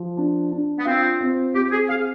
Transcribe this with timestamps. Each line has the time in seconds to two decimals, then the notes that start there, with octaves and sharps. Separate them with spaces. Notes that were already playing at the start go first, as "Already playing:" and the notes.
Already playing: F3
0.17 D4
0.52 D4
0.78 B3
0.85 C4 F4
1.21 C4
1.54 C4 G4
1.72 G#4
1.89 G#4 F5